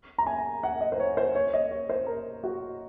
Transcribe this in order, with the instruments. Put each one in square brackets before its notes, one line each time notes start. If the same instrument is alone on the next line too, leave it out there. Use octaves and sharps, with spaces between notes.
[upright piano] A#5
G#5
F#5
D#5
C5
C#5
C5
C#5
D#5
C#5
C5
A#4
F#4